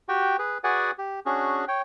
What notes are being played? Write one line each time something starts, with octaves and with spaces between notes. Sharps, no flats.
F#4 G4 G5
G#4 B4
F#4 G#4 B4 D5 F#5 G#5
G4
C#4 D4 F#4 G#4
C#5 G5